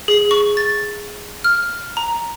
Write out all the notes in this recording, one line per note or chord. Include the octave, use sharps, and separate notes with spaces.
G#4
C#6
A6
F6
A#5